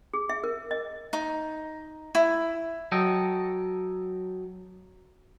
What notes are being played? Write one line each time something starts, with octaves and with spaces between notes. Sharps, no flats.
G#4
E5
A#4
D#5
D#4
E4
F#3 A4 D#5 G5